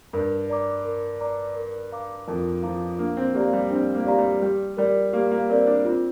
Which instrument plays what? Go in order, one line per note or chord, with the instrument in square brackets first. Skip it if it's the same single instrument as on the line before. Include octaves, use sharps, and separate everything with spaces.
[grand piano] G2 [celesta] A#4
[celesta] D5 A#5 D6
A#4
D5 A#5 D6
A#4
F5 A#5 D6
[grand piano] F2 [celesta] A#4
[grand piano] F3 [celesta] F5 A#5 D6
[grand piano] A#3 [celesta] D4
[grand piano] C4
[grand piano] A#3 [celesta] G4 D5 F5 A#5
[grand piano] G3
[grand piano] C4 [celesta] D4
[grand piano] A#3
[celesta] G4 D5 F5 A#5
[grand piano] G3
[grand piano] G3 [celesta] G4
[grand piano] G3 [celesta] A#4 D5
[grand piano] A#3 [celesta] G4
[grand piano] A#3
[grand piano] C4 [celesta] A#4 D5
[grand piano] D4
[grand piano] C4 [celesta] F4